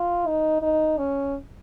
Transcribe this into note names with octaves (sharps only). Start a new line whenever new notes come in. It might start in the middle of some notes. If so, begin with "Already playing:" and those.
Already playing: F4
D#4
D#4
C#4